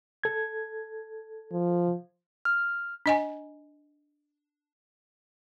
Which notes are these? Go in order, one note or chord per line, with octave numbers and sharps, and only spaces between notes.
A4 G#6
F3
F6
D4 D#5 G#5